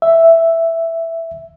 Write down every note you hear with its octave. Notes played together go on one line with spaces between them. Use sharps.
E5